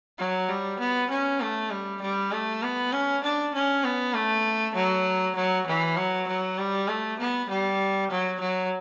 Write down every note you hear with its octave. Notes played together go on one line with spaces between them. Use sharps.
F#3
G3
B3
C#4
A3
G3
G3
A3
B3
C#4
D4
C#4
B3
A3
F#3
F#3
E3
F#3
F#3
G3
A3
B3
G3
F#3
F#3